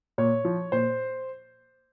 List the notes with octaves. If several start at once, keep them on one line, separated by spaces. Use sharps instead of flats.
A#2 C#5
F3
A#2 C5